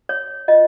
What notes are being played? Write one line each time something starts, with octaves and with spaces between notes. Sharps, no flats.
C#5
F4 D#5